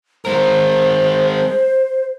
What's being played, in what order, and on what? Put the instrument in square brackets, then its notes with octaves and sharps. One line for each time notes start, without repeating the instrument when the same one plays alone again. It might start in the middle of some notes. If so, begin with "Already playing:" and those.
[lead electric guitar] G#3 A#4 [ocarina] C5